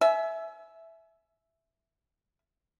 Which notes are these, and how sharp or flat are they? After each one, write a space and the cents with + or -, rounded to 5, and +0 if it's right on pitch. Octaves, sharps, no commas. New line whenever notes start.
E5 +0 G#5 +35